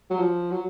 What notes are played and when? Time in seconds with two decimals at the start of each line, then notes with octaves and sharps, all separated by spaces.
0.10 F#3
0.19 F3
0.51 F#3